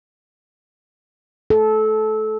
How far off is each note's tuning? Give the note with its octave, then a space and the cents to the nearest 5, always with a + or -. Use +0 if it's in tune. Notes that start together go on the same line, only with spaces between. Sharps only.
A4 -20